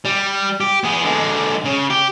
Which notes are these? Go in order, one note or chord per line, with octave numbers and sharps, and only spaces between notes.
G3
G4
B3 G#4
D3 G#3
C#3
G4